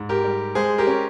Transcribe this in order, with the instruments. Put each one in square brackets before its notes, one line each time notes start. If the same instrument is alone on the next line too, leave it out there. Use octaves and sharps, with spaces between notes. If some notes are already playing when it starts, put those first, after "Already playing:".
Already playing: [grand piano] G#2
G4 A#4
G3
G#3 G#4 C5
G4 A#4
C#4